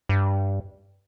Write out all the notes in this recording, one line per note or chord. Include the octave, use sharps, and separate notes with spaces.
G2